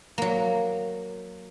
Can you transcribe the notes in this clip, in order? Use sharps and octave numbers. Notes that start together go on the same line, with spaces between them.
F#3 A#3